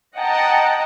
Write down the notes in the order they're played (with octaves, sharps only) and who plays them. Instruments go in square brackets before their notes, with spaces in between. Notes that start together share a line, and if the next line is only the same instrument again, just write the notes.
[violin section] D#5 F#5 G5 A5 A#5